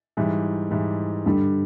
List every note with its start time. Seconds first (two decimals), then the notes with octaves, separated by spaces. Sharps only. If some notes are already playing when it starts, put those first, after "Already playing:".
0.17 G#2 E3 G3
0.71 G#2 E3 G3
1.26 G2 D3 G3